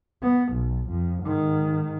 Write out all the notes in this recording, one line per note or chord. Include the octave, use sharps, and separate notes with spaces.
B3
B1
F2
G#2 D#3